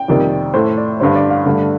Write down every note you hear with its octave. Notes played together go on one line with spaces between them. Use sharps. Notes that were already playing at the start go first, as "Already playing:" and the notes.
Already playing: G5
F2 C3 D#3 G3 A#3
A2 A3 C5
D5
G2 D3 G3 C5
D5
F5
G2 D3 A3